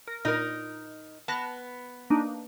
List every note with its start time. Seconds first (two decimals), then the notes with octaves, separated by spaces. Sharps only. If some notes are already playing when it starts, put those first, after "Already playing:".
0.08 A#4
0.25 A#2 D#4 A#4
1.28 B3 A5 F#6 A#6
2.10 A#3 D4 D#4